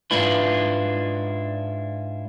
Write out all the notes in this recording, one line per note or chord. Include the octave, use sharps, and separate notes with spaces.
G#2 D4 E4 F4 B4